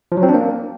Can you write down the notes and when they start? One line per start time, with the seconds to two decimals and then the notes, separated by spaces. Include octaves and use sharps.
0.12 F3
0.17 F#3
0.23 C4
0.29 D4
0.34 A#3